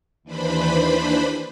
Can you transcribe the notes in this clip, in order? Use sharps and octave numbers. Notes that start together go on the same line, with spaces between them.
D#2 E3 D4 B4 C5 B5